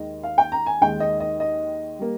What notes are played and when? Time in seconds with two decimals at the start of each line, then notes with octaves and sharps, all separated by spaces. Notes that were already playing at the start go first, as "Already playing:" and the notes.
Already playing: D#2 D#3 G#3 D#5
0.23 F5
0.38 G5
0.52 A#5
0.66 G#5
0.81 D#2 D#3 G#3 G5
1.00 D#5
1.20 D#5
1.40 D#5
1.99 G3 A#3